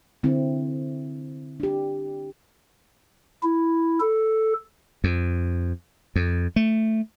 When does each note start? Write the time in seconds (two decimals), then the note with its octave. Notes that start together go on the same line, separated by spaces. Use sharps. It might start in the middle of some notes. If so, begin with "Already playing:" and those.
0.23 D3 C4 E4
1.60 D4 G4
3.43 E4
4.00 A4
5.04 F2
6.16 F2
6.56 A3